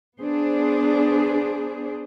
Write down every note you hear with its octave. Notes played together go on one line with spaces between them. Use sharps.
B3 D4 G#4 C5